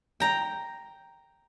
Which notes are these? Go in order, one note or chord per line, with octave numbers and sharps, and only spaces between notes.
G5 A#5